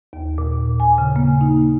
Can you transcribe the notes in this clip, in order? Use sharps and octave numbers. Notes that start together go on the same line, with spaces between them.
D#2
A#2
G#5
C#3
A#3
D#4